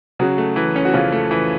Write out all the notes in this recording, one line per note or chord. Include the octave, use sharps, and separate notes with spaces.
C#3 F#3 F#4
A3
E3
C#4
F#4
C#3 F3 F4
A3
E3